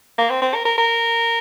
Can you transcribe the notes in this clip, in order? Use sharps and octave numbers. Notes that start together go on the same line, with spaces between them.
A#3
C4
C4
A#4
A#4
A#4